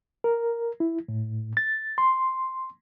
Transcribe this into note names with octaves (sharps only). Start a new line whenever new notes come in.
A#4
E4
A2
A6
C6